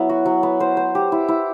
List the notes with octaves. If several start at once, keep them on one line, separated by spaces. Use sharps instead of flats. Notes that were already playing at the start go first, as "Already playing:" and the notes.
Already playing: F#3 B3 E4
F#4
F#3
B3
C5
C5
G4
E4
E4